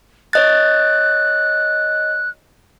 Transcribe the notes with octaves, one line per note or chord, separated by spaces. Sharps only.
C#5 D#5 F#6 A6